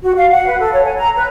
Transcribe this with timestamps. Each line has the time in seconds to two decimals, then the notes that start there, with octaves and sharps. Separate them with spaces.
0.03 F#4
0.16 F5
0.31 F#5
0.46 B4
0.60 A4
0.73 C#5
0.85 G#5
0.97 A#5
1.16 B4